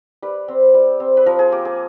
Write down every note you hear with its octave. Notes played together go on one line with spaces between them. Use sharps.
G3 B4
C4
G3
C4
B4
F3 A#4
G#4
A#3 G4
G#4